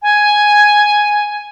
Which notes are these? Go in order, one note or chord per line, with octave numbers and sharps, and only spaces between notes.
G#5